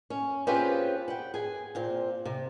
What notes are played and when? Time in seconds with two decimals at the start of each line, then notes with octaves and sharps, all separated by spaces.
0.10 C#4
0.47 C4 C#4 F4 G4 G#4 B4
1.08 F#5 G5
1.34 G#4 G#5
1.75 A#2 C4
2.25 C3